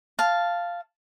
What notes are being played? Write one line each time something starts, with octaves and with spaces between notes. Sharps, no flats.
F5 A5